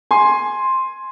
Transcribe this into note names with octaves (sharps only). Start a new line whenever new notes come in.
G#5 C6